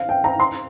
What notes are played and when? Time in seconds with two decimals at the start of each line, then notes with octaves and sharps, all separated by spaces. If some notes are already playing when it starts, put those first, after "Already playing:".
Already playing: F5
0.09 G5
0.24 A#5
0.40 C6